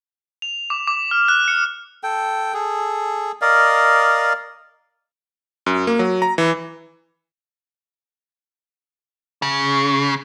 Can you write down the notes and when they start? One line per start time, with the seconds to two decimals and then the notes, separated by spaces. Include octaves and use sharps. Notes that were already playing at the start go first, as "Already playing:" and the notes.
0.42 F7
0.70 D6
0.87 D6
1.11 F6
1.28 F#6
1.48 C#7
2.03 A4 G5
2.54 G#4 A4
3.41 A#4 D5 D#5 F5
5.66 F#2
5.87 A#3
5.99 F#3
6.22 A#5
6.38 E3
9.42 C#3